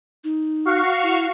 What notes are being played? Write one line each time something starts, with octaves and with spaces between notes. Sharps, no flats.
D#4
F#4 F5 C#6
E4